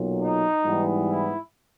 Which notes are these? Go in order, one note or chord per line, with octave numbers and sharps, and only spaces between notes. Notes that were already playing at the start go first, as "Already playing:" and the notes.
Already playing: B1 A#2 F#3
D#4
G#2 E3 G3 B3
E4